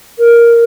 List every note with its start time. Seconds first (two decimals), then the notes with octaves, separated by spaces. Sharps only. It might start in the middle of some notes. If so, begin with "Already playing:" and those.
0.18 A#4